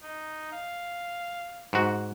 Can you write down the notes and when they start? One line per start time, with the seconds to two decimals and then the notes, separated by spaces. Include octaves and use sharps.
0.03 D#4
0.52 F5
1.73 G#2 F#4